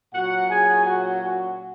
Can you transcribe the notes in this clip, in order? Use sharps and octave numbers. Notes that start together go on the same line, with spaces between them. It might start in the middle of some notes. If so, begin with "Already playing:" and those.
A#2 F#3 C#4 F#4 F#5
G#4 G#5
F#4 F#5
F#4 F#5